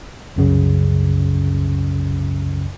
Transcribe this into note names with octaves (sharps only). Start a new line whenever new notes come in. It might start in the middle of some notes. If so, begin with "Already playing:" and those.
C2 F#2 C#3